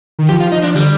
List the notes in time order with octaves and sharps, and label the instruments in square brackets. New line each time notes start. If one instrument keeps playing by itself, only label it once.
[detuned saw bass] D#3
[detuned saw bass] F3 [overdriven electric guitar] G4
[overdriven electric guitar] F4
[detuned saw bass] F3 [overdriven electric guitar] D#4
[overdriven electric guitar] D4
[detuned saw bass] D3 [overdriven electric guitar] G3